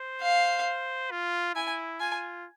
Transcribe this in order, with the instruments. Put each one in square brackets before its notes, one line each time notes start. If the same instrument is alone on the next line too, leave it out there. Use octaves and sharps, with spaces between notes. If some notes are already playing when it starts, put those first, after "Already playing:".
Already playing: [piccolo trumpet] C5
[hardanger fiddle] F5
[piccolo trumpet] F4
[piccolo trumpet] E4 [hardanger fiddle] G#5
[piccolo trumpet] F4 [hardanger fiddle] G#5